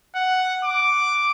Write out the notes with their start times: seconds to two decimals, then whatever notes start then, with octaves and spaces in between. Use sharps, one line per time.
0.16 F#5
0.65 D6